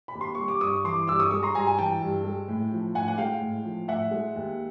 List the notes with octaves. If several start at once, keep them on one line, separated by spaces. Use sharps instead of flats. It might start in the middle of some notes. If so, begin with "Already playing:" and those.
B5
D#2
C6
G3 C#6
D6
G2 C#6 D#6
E3 C6 D6
G2 D6 E6
C#6 D#6
G#3 C#6 D#6
A#5 C6
G2 G#5 A#5
G#5
E3 G5 A5
G2
G#3
A2
F3
A2 F#5 G#5
F#5
G#3 F5 G5
A2
F3
A2 E5 F#5
G#3
D#2